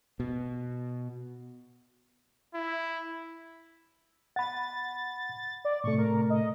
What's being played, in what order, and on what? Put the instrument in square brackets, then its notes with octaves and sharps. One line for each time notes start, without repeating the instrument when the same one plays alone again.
[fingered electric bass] B2
[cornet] E4
[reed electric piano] F#5 B5 [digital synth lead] A6
[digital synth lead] D5
[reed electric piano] A2 C3 A3 [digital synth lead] C#6
[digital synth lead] A#4
D#5